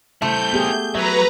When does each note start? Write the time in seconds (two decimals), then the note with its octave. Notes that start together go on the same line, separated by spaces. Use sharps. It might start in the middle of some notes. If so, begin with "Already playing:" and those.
0.22 A3 E4 C5 G6
0.53 B3 G4 G#4
0.95 F#3 B4 E5 A#5